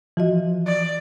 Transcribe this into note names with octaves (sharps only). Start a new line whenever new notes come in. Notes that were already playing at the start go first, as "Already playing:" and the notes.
E3 F3 F#4 D#5
D5